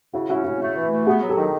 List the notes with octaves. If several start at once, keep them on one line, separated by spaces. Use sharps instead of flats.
C#3 E4 F#4
C#4 E4 F#4
C#3 E4 F#4
A3
E3
A3
B3 F#4 G#4
F#3
G4 A4
D#3